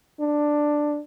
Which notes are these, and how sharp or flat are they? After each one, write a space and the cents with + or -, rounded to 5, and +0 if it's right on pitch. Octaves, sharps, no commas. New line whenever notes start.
D4 +10